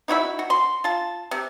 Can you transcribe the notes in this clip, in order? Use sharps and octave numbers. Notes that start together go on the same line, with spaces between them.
D#4 E4 F#4 E5
F#4
C6
F4 A5
C3